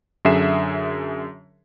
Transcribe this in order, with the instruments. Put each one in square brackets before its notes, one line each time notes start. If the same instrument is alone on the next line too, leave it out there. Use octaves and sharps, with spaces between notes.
[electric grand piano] F#2 D3 G#4 E5 C7 E7